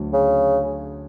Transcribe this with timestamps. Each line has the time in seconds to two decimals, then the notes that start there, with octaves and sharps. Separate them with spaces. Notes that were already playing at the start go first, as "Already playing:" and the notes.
Already playing: D2 D3 F#3
0.13 C#3